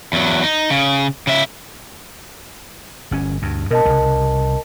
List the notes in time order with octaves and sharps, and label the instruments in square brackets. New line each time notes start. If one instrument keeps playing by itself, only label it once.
[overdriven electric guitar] E2 F#3
D#4
C#3
C#3 E5
[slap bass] G1 C#4
D2 G2
[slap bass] B2 [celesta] A#4 D#5 A5
[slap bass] C2 C#3